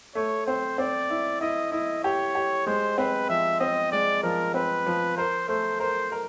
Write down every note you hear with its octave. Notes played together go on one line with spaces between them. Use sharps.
A3 C#5
C4 C5
C4 D5
E4
E4 D#5
E4 D#5
G4 C#5
G4
G#3 C5
C4 B4
F3 E5
C4 D#5
G#3 D5
F3 A#4
C4 B4
F3
A#4 C5
A3 C5
A#4 C5
A#4